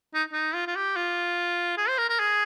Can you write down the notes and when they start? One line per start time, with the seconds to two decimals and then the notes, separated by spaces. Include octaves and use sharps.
0.14 D#4
0.32 D#4
0.55 F4
0.67 F4
0.75 G4
0.96 F4
1.77 G#4
1.88 C5
1.98 A#4
2.09 A#4
2.19 G#4